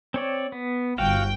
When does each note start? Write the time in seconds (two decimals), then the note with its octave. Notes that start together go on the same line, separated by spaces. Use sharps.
0.14 C4 C#5 D5
0.52 B3
0.98 G1 F#4 F5 G5